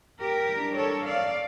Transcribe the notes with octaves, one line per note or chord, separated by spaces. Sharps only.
G4 A#4
E3 G3 D4
A4 C#5
D5 F5